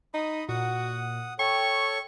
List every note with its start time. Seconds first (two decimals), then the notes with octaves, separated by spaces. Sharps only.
0.14 D#4 B5 D#6
0.49 A#2 F#4 F#5 D#6
1.39 A4 C#5 G5 C#6